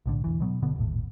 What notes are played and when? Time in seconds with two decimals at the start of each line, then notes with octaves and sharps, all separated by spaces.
0.06 B1 A2 D3
0.24 E1 C#2 E3
0.40 B2 F#3 B3
0.62 G1 B2 D3 B3
0.76 D#1 G#1 A2